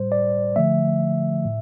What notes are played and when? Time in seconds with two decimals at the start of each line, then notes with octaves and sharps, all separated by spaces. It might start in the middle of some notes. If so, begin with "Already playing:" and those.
Already playing: A2 G3 C5
0.12 D5
0.56 D3 F3 A3 E5
1.45 A2